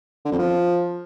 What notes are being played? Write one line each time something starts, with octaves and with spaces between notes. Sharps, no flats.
D3
F2
F3